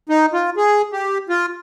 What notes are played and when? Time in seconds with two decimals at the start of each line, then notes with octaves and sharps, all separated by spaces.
0.09 D#4
0.33 F4
0.57 G#4
0.93 G4
1.29 F4